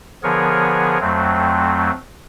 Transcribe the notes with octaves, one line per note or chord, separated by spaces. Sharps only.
D3 F3 B3 G#4 A#4 C#5
F2 F#3 A3 C4